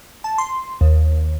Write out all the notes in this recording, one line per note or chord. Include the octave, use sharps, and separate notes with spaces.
A5
C6
D#2